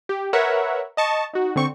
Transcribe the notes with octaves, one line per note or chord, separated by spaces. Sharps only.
G4
A#4 B4 C#5 E5 F#5
D#5 A5 C#6
D#4 F#4
D3 C4 C#6